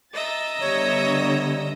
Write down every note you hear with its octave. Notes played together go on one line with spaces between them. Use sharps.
D#5 E5 A#5 A6
D3 G3 B3 C#5